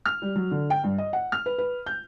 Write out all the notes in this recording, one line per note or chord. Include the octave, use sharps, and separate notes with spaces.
F6
G3
F#3
D3
G5
G2
D#5
F#5
F6
B4
B4
G6